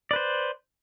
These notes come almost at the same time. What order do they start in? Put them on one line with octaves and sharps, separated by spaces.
D5 B4 C5